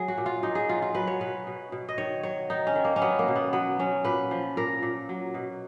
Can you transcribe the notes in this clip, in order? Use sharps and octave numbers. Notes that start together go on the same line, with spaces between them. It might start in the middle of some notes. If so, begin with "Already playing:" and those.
Already playing: F#3 G#4
F#4
A#2
F4
A#2 D#4
G#4
F#3 F4
F4
F#3 B4
C#5
B2 B4
B2
B2
D#5
D#3 C#5
F#3 C#5
D#3 D#4
C#4
D#3
A#3
C#4
F#3 B3
A#3
B2
B3
F#3 B3
F#3 C#4
A#2 B4
F3
A#2 A#4
A#2
F#3
B2